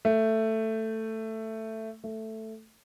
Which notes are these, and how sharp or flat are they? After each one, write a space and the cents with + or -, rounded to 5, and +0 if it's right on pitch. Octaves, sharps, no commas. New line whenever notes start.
A3 +10
A3 +5